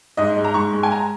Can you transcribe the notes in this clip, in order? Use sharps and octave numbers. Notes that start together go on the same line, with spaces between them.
G#2 D#5
G#3
A#5
G#2 C#6
G#3
G#5
A#5